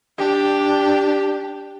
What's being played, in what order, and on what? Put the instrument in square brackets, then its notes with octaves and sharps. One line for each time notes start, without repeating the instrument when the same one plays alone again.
[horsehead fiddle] D4 [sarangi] G4